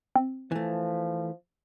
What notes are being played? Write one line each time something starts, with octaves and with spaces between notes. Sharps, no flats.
C4
E3 F3 A3